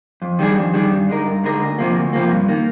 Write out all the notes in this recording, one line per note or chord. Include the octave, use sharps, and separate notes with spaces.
F2
D#3 G3 D4 G#4
F2
D#3 G3 D4 G#4
G2
D3 G#3 D#4 A#4
G2
D3 G#3 D#4 A#4
D2
C3 F3 A#3
D2
C3 F3 A#3
G2
D#3 A#3